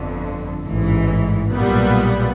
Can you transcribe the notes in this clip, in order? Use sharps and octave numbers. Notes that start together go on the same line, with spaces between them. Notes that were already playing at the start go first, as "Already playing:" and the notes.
Already playing: G1 F2 D3
A1 G#2 E3
B1 A#2 G3 B3